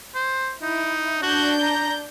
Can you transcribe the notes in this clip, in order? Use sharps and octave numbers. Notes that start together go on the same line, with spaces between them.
C5
D#4 E4
D4 F#4 G6
A#5